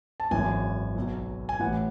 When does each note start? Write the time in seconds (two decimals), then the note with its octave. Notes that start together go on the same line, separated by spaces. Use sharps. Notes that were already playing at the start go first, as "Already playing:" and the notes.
0.20 A5
0.31 G#1 F#2 E3 G#5
0.95 B1 B2 F#3
1.49 G#5
1.60 A1 A2 E3 F#5